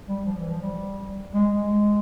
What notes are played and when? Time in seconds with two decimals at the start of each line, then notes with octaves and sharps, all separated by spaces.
0.09 G3
0.26 F3
0.38 E3
0.50 F3
0.62 G3
1.34 G#3
1.52 G#3